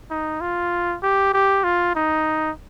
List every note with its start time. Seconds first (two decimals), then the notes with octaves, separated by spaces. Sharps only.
0.11 D#4
0.41 F4
1.03 G4
1.33 G4
1.64 F4
1.95 D#4